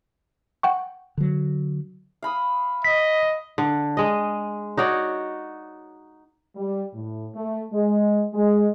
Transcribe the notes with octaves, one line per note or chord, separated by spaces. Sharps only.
F#5 G5 C#6
D3 F#3
F5 B5 D#6
D#5 B6
D3
G#3 D#5
D#4 F#4 C#5 D5
G3
A2
A3
G#3
G#3